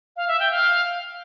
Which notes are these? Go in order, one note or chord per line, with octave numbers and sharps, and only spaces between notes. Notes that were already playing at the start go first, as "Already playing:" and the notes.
F5
E5
G5
F5